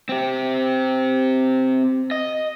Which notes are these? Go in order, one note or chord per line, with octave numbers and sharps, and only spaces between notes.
C4 G4
D#5